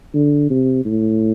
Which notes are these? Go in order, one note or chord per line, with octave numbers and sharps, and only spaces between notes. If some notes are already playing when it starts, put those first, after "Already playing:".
D3
C3
A2